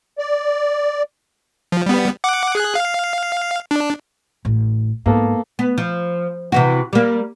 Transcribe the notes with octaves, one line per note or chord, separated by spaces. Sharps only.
D5
F3
G3 B3
F#5 D6
G#4 F#6
F5
D4
A1
G#2 A#3 B3 A4
B3
F3
C3 E3 F#4
G3 A#3